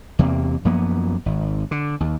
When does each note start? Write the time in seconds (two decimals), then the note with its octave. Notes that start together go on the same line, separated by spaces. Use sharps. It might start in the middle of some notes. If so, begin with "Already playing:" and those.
0.19 E2 C3 A#3
0.65 F#2 F3 A#3 B3
1.26 G#1
1.71 D3
2.00 D#2